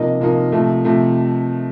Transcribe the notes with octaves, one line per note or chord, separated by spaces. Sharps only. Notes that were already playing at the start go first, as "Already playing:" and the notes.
Already playing: C3 F3 A#3 D#4 D#5
C3 F3 A#3 D#4
C3 F3 A3
C3 F3 A3